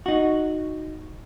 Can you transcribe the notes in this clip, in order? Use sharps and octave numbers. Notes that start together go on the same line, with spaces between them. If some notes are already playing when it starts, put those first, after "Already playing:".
D#4 F#4